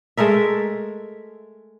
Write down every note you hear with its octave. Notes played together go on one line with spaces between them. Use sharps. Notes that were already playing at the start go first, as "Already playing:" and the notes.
G#3 A3 A#4 E5